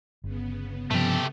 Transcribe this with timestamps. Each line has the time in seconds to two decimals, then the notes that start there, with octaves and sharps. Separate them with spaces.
0.24 G1 C#3 B3
0.91 G2 C3 F3 A3 G4